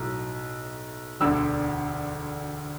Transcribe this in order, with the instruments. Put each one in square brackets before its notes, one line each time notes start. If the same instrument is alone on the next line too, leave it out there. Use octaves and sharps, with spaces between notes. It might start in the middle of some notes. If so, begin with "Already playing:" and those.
Already playing: [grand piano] B1 A2 F#3
E1 D2 D3 E6